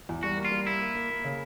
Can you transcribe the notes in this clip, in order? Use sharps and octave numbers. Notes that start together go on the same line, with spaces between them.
E2
G3 F#4
A#3
F4
G3
A#3 E4
A#3
A#3
A#3
C#3